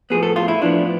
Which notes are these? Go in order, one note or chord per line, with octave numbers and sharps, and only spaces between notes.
A2 F3 B3 G#4
A4
F4
E4
A2 F3 B3 D4